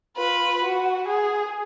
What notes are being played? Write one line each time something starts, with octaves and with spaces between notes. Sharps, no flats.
F4 B4
F#4
G#4